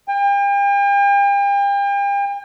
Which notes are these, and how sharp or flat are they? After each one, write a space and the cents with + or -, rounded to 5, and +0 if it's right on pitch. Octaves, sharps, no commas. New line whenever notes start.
G5 +40